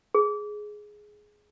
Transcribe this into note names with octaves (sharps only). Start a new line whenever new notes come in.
G#4